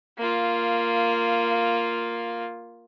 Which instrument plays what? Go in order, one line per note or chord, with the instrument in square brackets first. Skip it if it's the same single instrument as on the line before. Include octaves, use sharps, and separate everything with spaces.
[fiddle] A#3 F4